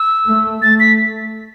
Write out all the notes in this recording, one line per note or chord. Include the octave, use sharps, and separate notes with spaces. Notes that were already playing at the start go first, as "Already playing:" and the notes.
Already playing: E6
A3
A3 A6
B6